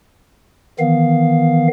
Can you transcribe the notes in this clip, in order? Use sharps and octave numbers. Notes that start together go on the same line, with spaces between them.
D#3 E3 B3 F5